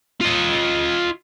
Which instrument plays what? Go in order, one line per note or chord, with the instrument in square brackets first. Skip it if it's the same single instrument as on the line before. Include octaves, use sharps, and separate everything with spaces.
[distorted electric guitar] F4 D#5